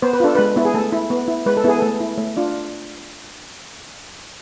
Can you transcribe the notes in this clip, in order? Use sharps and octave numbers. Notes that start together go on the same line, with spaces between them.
B3 C5
B4
D4 F4 A4
G#3 B4
B3 E4
G#4
A3 A4
E4
B3
E4
G#3 B4
A4
B3 E4 G#4
A3 A4
E4
A3
D4 F4